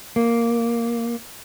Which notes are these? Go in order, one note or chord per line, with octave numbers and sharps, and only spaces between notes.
A#3